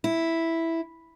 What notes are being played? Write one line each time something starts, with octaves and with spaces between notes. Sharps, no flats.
E4